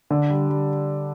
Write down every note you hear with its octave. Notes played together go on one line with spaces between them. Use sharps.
D3
G3
G3